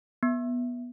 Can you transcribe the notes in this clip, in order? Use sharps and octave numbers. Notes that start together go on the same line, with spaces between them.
B3